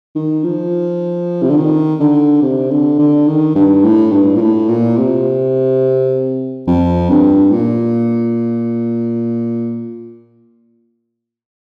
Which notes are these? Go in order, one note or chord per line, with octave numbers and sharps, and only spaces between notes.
D#3
F3
C3
D3
D#3
D3
C3
D3
D3
D#3
G2
A2
G2
A#2
A2
A#2
C3
F2
G2
A#2